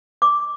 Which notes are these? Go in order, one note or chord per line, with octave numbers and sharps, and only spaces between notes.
D6